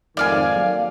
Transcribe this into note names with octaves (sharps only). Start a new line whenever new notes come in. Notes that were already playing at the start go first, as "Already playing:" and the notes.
F2 G#2 D#3 D5 F5 G#5
F#3 A#3